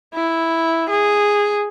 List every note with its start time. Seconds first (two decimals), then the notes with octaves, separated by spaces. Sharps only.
0.15 E4
0.90 G#4